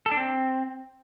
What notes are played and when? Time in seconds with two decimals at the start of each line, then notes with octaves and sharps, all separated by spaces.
0.06 A4
0.11 D4
0.17 C4